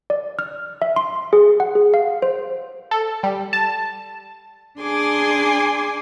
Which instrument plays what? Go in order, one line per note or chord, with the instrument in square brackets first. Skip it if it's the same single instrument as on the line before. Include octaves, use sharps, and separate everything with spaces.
[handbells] D5
F6
E5
C6
G#4
F#5
G#4
F5
C5
[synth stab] A4
G3
A5
[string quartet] D4 G#4 G#5 C6 D6